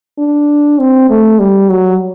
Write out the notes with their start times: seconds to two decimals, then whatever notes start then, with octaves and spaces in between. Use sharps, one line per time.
0.18 D4
0.79 C4
1.10 A3
1.39 G3
1.70 F#3